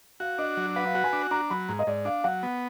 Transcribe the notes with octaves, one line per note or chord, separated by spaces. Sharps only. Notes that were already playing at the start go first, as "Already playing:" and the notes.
F#4 F5
D4 D#5
F#3
B4 F#5
F5
F#4 F#5
G#5
D4
D4 A#5
F#3 B5
G#2 A#5
D#5
G#2 D5
D4 F5
F#3 F#5
B3